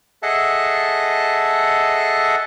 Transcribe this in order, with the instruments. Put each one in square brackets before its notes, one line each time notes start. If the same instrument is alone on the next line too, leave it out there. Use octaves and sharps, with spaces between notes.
[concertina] G#4 A4 D#5 E5 F#5 A5